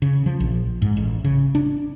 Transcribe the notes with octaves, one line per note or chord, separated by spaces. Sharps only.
C#3
F3
A#1
G#2
A1
C#3
D4